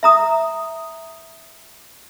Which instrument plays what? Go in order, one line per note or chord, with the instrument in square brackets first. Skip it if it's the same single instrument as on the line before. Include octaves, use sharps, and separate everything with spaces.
[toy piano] E5 A#5 D#6